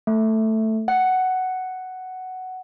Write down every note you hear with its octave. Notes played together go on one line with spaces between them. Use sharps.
A3
F#5